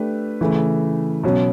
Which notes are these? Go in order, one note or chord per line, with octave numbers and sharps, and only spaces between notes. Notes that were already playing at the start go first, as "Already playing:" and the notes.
Already playing: A3 D4 G4 B4
C#3 E3 A3
B2 F#3 C#4